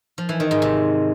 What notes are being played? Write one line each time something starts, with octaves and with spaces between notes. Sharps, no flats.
F3
E3
D#3
G#2
C3